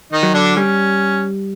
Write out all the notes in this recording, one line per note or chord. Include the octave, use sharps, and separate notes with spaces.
D#3 D#4
F#3
D3 D4
G3 C#4